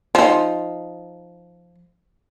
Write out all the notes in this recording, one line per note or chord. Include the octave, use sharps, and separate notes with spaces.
F3 D#4